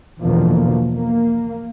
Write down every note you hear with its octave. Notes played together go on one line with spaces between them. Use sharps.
E2 B2 D3 F3 A#3
A#3